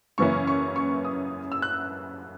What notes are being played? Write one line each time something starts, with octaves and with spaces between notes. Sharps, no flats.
F#2 C#3 E3 A#3 C#4 C#6
C#6
C#6
D#6
E6
F#6